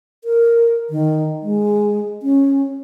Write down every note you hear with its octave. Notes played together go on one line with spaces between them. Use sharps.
A#4
D#3
G#3
C#4